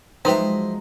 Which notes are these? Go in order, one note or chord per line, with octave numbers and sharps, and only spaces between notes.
F3 F#3 G#3 D#4 B4 C5 E5 G5